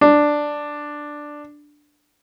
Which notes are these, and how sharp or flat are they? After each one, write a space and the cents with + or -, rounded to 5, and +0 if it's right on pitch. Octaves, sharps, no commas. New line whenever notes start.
D4 +5